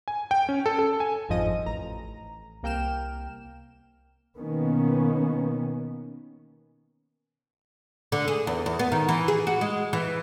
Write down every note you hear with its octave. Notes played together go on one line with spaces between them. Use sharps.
G#5
G5
C#4
A4
A4
G#5
G1 F2 G#2 F3 D#5 D#7
A1 A#5
C2 A#3 G5 F6 E7
B2 D#3 A#3 B3 C#4
D3
G#4
E2
E2
B3
D#3
E3
G#4
F#4
G#3
E3